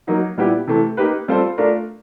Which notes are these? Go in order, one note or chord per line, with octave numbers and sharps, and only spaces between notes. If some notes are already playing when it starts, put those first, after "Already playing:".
F#3 A#3 D#4 F#4
A#2 G3 B3 E4 G4
C3 E3 A3
A#3 D#4 G4 B4
G3 C4 F4 A4 C5
A3 D4 F4 A#4